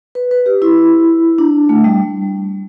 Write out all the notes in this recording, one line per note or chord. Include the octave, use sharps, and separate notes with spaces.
B4
B4
G4
E4
D4
A3
G3